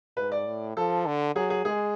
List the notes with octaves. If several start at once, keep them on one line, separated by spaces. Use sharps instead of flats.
G#2 B4
D5
A2
F3 A4
D3
F#3 G#4
G#4
G#3 G#4